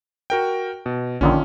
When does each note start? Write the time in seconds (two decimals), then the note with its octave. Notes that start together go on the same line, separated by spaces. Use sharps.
0.30 F#4 A#4 G5
0.86 B2
1.21 A#1 D3 D#3 C#4 F4